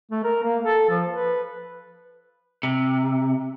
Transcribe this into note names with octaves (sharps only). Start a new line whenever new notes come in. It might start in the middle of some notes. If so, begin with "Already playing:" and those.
A3
A#4
A#3
A4
F3
B4
C3